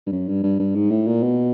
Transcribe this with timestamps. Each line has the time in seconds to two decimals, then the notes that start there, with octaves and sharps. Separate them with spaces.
0.07 G2
0.12 F#2
0.29 G2
0.44 G2
0.60 G2
0.75 G#2
0.91 A2
1.07 A#2
1.23 B2